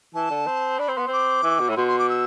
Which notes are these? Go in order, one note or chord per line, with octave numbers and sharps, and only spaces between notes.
E3 A5
D3
C4
D4 B5
C4
B3 C6
C4 D6
E3
B2
A2 B5
B2 C6
C6
D6
E6